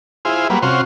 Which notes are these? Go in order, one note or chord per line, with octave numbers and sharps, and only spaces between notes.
E4 F4 G#4 C5
F#3 G3 A#3 B4
C3 C#4 F4 F#4 C6